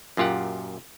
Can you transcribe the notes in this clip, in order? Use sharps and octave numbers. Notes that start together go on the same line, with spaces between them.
F#2 A#2 F4 G4 F#5